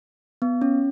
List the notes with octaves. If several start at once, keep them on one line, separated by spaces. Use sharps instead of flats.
B3
C#4